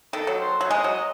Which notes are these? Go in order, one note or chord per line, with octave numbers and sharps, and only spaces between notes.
D#3 A4
F#3
C5
F#3
G#3 D#5
F#3